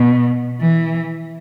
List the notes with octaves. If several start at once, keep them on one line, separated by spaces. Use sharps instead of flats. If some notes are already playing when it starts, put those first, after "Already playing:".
Already playing: B2
E3